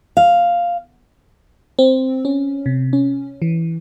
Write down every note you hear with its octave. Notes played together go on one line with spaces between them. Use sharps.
F5
C4
C#4
C3
C#4
E3